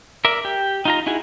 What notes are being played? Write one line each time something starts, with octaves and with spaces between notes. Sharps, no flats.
A#4 D5 E5
G4
D#4 F4 A#5
D#4 E4 F#4 G#4